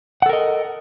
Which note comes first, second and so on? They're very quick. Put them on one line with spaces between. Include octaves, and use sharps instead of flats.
F#5 A4 A#4 D#5